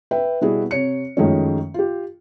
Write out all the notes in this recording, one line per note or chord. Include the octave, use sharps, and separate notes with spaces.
B4 E5 G5
B2 G3 B3 E4 F#4 G#4
C3 C#5 C#7
F#2 D#3 F3 G#3 A3 C#4
F4 G4